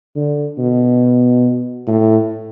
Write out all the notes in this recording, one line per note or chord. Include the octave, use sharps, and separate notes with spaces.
D3
B2
A2